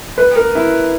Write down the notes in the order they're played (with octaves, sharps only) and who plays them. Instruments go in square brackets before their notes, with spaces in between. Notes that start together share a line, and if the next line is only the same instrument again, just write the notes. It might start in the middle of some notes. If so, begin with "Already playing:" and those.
[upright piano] B4
A#4
E4